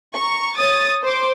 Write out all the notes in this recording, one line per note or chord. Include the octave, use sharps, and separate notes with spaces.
A#5 C#6
C#5 D#6 A6
C5 C6 D6